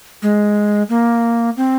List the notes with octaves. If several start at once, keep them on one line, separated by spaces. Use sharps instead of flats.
G#3
A#3
C4